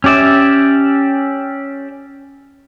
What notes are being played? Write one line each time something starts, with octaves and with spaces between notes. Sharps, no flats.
C#4 G4 D5 E5